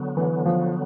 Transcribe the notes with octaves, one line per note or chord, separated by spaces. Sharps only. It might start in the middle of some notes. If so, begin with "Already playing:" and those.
Already playing: D3 F#3 B3
E3
F3